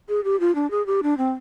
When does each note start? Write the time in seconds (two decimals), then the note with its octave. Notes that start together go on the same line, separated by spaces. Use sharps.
0.09 G#4
0.24 G4
0.40 F4
0.55 D4
0.71 G#4
0.86 G4
1.03 D4
1.18 C4